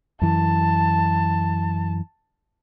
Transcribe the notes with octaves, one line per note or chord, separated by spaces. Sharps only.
F#2 E3 A5